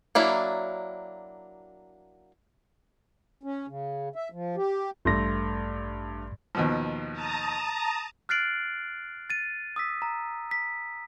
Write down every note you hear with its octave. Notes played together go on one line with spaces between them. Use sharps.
F#3 A#3 D4 E4
C#4
C#3
E5
F3
G4
A1 G2 A3 C6 A#6
D#2 B2 F3
A5 A#5 D#6
F6 F#6 A6 C7 D7 F#7
A6 D#7
D#6 E6 B6
A#5
B6